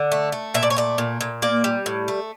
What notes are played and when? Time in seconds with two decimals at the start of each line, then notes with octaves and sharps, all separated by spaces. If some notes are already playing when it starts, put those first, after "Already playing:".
Already playing: D3
0.12 A3
0.32 A3
0.54 A#2 E5
0.63 D5
0.70 C#5
0.76 A3 D5
0.98 A#2
1.21 A#2
1.42 A#3 D5
1.64 G3
1.86 A2
2.08 A3